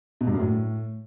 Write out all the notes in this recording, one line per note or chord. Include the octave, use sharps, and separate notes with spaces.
B2
G2
F#2
A2